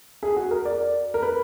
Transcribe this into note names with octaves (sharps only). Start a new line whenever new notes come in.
G#4
F#4
A#4
D5
A#4
B4